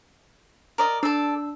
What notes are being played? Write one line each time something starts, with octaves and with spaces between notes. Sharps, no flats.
A#4 D5 D#5
D4 A4 D5 E6